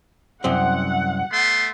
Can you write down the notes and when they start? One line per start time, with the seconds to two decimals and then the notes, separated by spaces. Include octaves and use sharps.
0.44 C2 F#2 C4 F#5
1.32 A3 B3 C6